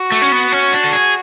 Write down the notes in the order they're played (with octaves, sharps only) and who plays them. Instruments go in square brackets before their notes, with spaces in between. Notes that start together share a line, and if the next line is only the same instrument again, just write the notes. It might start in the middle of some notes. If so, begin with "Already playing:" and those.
Already playing: [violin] F#4
[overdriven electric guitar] A3
C#4
B3
C#4
D4
A4
G#4